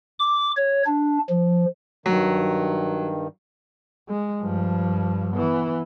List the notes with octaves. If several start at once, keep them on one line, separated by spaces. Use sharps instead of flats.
D6
C#5
D4
F3
G2 D#3 F#3
G#3
G2 F3
E3 B3